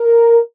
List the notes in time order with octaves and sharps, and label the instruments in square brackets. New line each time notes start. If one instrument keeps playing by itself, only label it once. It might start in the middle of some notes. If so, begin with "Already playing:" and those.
Already playing: [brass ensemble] A#4